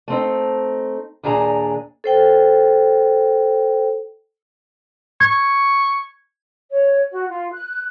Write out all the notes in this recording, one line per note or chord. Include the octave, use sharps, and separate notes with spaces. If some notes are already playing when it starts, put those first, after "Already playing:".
A3 C4 D#4
D#2 A#2 D4 G#4 A#5
A4 C5 G5
C#6 G#6
C#5
F#4
F4
F#6